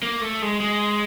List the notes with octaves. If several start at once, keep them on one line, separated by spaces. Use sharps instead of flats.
A#3
A3
G#3
G#3